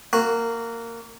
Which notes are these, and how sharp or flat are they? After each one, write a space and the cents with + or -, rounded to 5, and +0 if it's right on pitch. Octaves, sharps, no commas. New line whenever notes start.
A#3 -15 F#4 +0